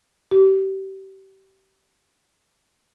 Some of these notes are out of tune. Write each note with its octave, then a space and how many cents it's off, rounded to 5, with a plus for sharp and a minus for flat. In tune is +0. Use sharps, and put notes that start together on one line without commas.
G4 -30